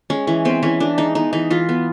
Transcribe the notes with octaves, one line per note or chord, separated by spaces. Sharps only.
G#3 C#4
E3 C#4
B3 C4
E3 C#4
E3 D4
G#3 D#4
B3 D#4
E3 D#4
E3 F4
B3